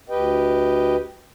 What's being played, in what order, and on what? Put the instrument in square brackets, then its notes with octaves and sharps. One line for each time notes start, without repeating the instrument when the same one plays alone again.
[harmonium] D2 G4 B4 D#5 G5